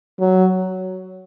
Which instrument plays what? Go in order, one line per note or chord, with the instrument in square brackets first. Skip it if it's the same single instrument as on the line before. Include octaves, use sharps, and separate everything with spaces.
[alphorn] F#3